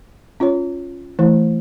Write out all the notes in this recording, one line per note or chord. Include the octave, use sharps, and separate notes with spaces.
C#4 F4 C#5
E3 A3 E4